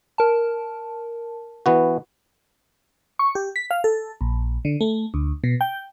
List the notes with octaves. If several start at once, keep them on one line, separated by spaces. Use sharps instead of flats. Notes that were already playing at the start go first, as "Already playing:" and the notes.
A#4 A5
E3 B3 F#4
C#6
G4
B6
F5
A4
A#1
D3
A3
D2
B2
G5